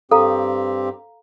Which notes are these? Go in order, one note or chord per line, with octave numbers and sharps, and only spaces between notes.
G2 C4 G4 A4 F5 A#5